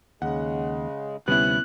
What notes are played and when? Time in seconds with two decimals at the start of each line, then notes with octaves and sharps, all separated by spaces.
0.22 D#2 C#3 G#3 F#5
1.28 D2 C3 G3 B3 C#4 E4 F#6